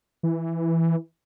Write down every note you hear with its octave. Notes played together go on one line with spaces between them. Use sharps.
E3